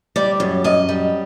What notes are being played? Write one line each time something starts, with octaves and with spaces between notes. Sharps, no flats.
G3 D5
F#2
F#2 D#5
G3